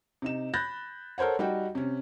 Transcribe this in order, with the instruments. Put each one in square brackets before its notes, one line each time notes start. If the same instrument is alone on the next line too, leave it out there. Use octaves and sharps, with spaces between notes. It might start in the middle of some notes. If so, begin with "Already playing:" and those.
[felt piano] C3 D#4 E7
B5 F#6 G6 A6 A#6
A4 A#4 C5 C#5 F#5
G3 D#4 F#4 G5
C3 C#4